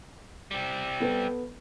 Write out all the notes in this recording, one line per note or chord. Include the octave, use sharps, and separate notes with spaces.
G3 C4
B3 A4 B4